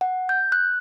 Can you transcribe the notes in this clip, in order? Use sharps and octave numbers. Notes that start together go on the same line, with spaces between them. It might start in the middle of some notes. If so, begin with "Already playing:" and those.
F#5
G6
F#6